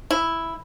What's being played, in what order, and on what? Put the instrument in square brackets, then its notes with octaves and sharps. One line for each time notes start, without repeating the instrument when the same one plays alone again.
[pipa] E4